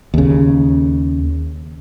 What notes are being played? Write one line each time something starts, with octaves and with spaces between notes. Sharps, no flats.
D#2 C#3